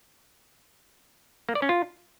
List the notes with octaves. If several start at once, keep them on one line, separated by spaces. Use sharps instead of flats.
A#3
D5
C#4
F4